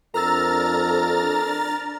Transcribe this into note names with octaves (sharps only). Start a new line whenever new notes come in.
F2 D4 A#4 A#5 E6 F6 A6